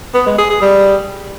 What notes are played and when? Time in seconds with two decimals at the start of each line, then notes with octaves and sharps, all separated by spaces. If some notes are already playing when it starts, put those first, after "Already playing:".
0.15 B3
0.26 G#3
0.38 G#4
0.50 G#4
0.62 G3